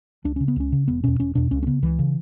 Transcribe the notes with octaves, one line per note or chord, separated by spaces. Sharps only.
C#2 D4
C#3 C#4
B3
C#2 C#4
C#3
E1 B3
E2 B2 C#4
E1 C#4
E2 B2 D4
C#2 C#4
C#4
C#3 B3
C#2 E3
C#3